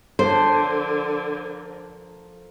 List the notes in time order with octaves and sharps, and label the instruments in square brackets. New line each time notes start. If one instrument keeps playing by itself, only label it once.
[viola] D3 [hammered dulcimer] F3 A4 A#4 [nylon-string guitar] C5